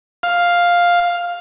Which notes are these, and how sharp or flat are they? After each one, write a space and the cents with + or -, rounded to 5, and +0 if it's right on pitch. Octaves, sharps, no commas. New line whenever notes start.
F5 +5